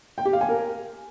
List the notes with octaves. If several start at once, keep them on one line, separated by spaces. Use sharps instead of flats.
G5
G4
F5
G#5
A#4